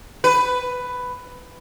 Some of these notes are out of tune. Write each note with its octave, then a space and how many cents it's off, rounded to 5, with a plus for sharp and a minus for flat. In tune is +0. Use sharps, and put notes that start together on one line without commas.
B4 +10